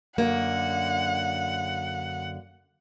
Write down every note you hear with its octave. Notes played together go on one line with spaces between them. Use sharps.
F#2 D3 A#3 F#5